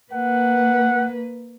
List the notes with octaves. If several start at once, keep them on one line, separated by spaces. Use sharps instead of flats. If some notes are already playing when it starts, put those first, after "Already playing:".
A#3 B4 F#5